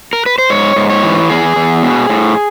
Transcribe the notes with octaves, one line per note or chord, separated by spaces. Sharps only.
A#4
B4
C5
G#2 C#5
G#2
C#5
E3
E2 G#4
E2
B2
A2